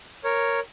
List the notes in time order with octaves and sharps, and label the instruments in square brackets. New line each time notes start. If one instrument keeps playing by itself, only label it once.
[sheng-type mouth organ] A#4 C#5